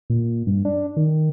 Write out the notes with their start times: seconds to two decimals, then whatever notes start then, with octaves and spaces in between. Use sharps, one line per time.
0.10 A#2
0.47 G2
0.65 D4
0.97 D#3